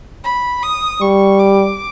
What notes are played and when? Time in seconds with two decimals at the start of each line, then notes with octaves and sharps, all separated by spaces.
0.24 B5
0.63 D#6
1.01 G3 C#6
1.40 D6